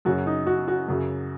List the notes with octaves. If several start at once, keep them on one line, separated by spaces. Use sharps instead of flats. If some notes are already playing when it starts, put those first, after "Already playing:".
F#2 C#3 F#3 F#4
D#4
F#4
F#4
F#2 C#3 F#3